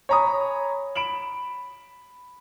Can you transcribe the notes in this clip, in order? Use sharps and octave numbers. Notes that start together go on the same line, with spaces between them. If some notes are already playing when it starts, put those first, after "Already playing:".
C#5 G#5 A#5 B5 D#6
B5 D7 E7 F#7